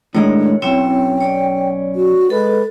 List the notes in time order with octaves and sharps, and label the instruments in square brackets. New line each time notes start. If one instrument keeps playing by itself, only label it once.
[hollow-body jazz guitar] A2 D#3 G#3 [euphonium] D4 [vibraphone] C#5
[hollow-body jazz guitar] B1 [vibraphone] C4 E4 C#5 [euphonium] C#4 [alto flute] G5
[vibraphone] C#5 D5
[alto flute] F#4
[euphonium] G#3 [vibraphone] A4 [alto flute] B4